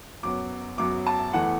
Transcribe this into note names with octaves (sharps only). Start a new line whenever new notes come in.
F#2 F#3 B3 D6
F#2 F#3 B3 D6
A5
E2 E3 A3 F#5